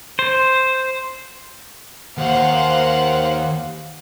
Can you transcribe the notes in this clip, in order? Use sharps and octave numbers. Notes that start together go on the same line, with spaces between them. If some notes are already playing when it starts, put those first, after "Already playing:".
C5
D#2 C5 F5 F#5